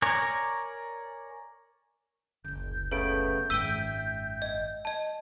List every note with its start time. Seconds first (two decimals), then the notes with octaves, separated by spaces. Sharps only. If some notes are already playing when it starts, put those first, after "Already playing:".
0.02 A#4 C#5 D5 G#5
2.45 F#1 D2 G6
2.91 C#3 A3 B3 B4 G6 D7
3.50 G#1 F#2 E5 G5 E6 D#7 G7
4.42 D#5
4.85 D#5 A5